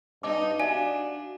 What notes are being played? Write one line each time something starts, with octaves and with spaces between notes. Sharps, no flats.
G2 D#4 D#5 A5 D6
D4 F#4 D5 E5 F5 G#5